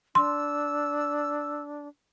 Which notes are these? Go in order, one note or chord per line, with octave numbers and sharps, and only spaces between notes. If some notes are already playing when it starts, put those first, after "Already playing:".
D4 C6 E6